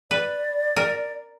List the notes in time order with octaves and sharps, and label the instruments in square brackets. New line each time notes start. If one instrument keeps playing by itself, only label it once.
[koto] B4 [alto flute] D5
[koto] A#4